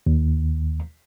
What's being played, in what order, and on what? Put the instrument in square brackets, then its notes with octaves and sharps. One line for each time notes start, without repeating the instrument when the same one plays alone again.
[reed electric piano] D#2